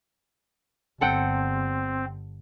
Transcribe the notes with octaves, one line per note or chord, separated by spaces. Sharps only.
G1 C4 A4 F#5 G5